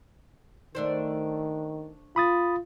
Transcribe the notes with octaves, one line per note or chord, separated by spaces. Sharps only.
D#3 A3 D4 C5
F4 B5 D#6 A6